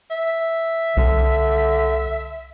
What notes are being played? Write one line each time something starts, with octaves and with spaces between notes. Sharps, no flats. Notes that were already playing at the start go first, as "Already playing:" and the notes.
E5
C2 D3